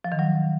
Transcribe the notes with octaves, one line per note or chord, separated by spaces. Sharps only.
F3
D#3
F#3